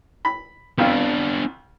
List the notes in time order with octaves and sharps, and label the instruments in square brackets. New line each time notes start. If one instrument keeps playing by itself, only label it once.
[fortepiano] B5
[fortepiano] C2 F2 F4 [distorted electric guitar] B3 D4